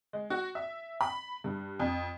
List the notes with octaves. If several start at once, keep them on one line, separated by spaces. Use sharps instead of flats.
G#3
F#4
E5
B5
G2
F2